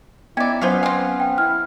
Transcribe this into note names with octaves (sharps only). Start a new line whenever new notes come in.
B3 C#4 D#4 E4 D5 E5 G#6
F#3 B3 C#4 F4 C5 C#5 F5
C4 F5 G#5
G5
E4 F6